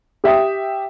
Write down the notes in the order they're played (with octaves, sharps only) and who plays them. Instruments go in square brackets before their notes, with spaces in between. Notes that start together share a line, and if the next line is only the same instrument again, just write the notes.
[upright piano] G4 E5 G5 D#6